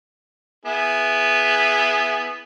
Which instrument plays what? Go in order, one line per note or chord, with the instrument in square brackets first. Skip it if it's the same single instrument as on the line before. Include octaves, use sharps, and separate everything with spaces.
[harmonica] B3 E4 G#4